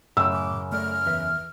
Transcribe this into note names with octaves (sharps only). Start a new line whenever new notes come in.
F#2 A2 C#3 G5 E6
D6
A3 D5 F6
E2 B4 E5